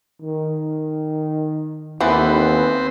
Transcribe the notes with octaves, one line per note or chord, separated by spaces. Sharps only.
D#3
D#2 E3 B3 C4 A4 B4 C5